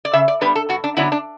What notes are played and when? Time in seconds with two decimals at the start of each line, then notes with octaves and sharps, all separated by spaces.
0.05 D5
0.13 C#3 E5
0.28 D5
0.41 G3 B3 D4 B4
0.56 A4
0.69 G2 F#4
0.84 D4
0.97 D3 F#3 B3 D4 E4
1.12 D4